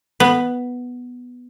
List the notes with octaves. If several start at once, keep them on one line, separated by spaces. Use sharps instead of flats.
B3